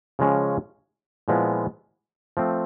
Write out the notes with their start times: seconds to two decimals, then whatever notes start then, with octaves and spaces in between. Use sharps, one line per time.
0.19 C#3 F3 G#3 C#4
1.28 A#2 F3 G#3 B3 E4
2.37 F3 A3 C4